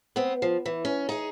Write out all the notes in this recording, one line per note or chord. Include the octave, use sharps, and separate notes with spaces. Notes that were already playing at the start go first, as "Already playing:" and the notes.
B3 C4
F3
E3
C#4
D#4 G#4